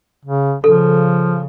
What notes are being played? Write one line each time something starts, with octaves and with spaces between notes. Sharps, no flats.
C#3
C#3 F3 A4